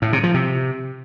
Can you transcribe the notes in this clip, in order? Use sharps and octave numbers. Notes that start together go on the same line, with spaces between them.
A2
C3
F3
C3